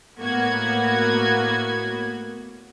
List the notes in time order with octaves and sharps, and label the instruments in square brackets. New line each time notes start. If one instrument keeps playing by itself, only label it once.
[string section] A2 A#3 B3 F#4 G#6